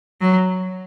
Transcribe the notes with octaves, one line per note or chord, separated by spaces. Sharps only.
F#3